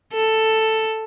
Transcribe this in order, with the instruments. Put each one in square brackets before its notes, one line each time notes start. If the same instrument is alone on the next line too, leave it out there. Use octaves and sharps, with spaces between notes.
[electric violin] A4